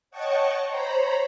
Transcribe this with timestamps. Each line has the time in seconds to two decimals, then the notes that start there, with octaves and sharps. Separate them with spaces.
0.11 C#5 D#5 F#5 G5 A5 C#6
0.68 C5 C#5 A#5 B5